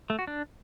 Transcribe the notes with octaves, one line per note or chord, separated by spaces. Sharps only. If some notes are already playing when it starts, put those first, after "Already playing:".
A3
F#4
D4